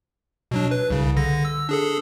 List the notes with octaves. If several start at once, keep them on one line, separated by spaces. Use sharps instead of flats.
B2 F#3 D4
B4
C2 C#3
D3 A#6
E6
D4 G#4 A4